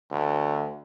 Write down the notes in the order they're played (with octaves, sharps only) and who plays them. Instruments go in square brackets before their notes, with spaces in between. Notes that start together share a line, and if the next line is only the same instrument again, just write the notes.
[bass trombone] D2